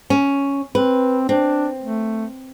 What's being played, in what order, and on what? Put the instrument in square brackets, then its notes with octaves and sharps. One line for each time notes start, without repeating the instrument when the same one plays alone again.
[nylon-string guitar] C#4
[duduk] C4 [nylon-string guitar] B4
[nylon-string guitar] C4 [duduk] D4
[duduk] A3